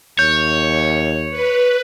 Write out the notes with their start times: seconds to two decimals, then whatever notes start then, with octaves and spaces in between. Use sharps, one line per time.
0.19 D#2 C#5 G6
1.30 B4